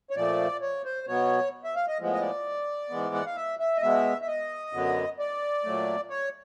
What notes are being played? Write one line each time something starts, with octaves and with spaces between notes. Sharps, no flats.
C#5
A#2 F3 A3 D5
C#5
C5
B2 F#3 B3 C#5
E5
F5
D#5
A2 F3 G#3 B3
D#5
D5
G#2 E3 G#3 B3
F#5
F5
E5
E5
D#5
B2 G#3 B3 E5
E5
D#5
F#2 D3 F#3 B3
D5
A#2 F#3 A3
C#5